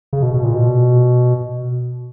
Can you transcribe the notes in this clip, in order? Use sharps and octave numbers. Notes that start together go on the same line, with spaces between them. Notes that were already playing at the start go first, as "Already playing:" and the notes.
C#3
B2
B2
A#2
B2